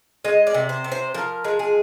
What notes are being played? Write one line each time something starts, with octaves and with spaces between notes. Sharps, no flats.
G#3 D#5
D5
C3
C5
C3
C5
F3 A#4
G#3
G#4